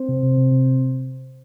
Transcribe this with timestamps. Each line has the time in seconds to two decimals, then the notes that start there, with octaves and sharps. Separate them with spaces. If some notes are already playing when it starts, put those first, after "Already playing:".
Already playing: C4 C5
0.08 C3
0.23 C3
0.37 C3
0.51 C3